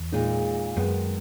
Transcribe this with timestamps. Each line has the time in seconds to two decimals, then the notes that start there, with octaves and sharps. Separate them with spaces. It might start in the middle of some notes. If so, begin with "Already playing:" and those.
Already playing: E2
0.12 A#2 G#3 D#4 G#4
0.76 F#2 D#3 G#3 B3